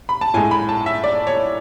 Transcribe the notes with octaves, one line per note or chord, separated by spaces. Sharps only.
B5
A5
A2 G#3 G#5
B5
A5
E5
D5
C#5